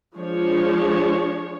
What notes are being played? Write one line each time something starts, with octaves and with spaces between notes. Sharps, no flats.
F3 G#3 D4 G#4 C#5